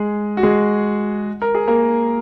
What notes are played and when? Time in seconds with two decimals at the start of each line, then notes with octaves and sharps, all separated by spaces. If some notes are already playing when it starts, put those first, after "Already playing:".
Already playing: G#3 G#4
0.37 F#4
0.43 G#3 G#4
1.42 A#4
1.55 G#4
1.68 A#3 A#4